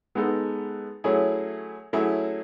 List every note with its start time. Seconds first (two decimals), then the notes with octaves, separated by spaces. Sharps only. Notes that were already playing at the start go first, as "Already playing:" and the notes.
0.15 G#3 B3 D#4 A4
1.04 F#3 A3 C#4 E4 G#4
1.93 F#3 A3 C#4 E4 G#4